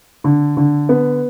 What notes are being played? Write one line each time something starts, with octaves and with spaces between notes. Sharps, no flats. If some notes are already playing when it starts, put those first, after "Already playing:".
D3
D3
B3